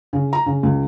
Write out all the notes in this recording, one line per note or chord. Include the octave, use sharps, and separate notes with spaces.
C#3
A#5
C#3
C#2